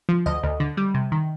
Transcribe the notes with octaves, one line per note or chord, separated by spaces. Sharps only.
F3
D2 D#5
D2
D3
G3
C3
D#3